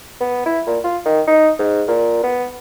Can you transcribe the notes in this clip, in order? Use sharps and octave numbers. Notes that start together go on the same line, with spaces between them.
B3
E4
A#2
F4
D#3
D#4
G#2
A#2
B3